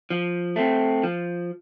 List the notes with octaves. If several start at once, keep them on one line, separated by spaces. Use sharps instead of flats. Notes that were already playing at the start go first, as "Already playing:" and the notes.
F3
A3 C4
F3